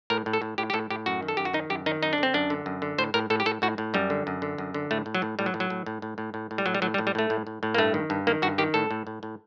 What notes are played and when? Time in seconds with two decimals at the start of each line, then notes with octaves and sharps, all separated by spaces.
0.10 A2 A#4
0.26 A2
0.33 A4
0.42 A2
0.58 A2 G4
0.70 G4
0.73 A2 A4
0.90 A2 G4
1.06 F#2 F#4
1.22 D#3
1.28 A4
1.37 F#2 G4
1.45 F#4
1.54 D#3 D#4
1.70 F#2 G4
1.86 D#3 D#4
2.02 F#2 D#4
2.13 D4
2.18 D3 C4
2.34 F#2 D4
2.50 D3
2.66 F#2
2.82 D3
2.98 A2 C5
3.14 A2 A#4
3.30 A2 A4
3.40 G4
3.46 A2 A4
3.62 A2 F#4
3.78 A2
3.94 F#2 G3
4.10 D3
4.27 F#2
4.42 D3
4.58 F#2
4.74 D3
4.91 A2 A3
5.06 A2
5.15 F#3
5.22 A2
5.39 A2 G3
5.46 F#3
5.54 A2
5.60 F#3
5.70 A2
5.86 A2
6.02 A2
6.18 A2
6.34 A2
6.51 A2
6.58 G3
6.66 A2 F#3
6.74 G3
6.82 A2 F#3
6.94 G3
6.98 A2
7.07 G3
7.15 A2 A3
7.30 A2
7.47 A2
7.63 A2
7.75 A#3
7.78 G2 A3
7.94 D#3
8.10 G2
8.27 D#3 A#3
8.42 G2 F#4
8.58 D#3 G4
8.74 A2 A4
8.91 A2
9.07 A2
9.23 A2